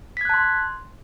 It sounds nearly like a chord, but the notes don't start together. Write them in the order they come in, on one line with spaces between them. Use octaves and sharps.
B6 G#6 F#6 A5 C6